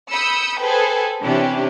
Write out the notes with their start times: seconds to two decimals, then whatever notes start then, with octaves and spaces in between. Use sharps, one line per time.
0.12 B5 D#6 E6 G6 C#7
0.61 G#4 A4 B4 C5 G5
1.22 C3 E3 C#4 D4 E4 G4